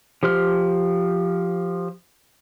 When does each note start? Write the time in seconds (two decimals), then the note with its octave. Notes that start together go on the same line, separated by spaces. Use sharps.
0.23 F3 G4 C5 F6